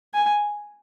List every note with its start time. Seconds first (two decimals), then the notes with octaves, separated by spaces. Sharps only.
0.14 G#5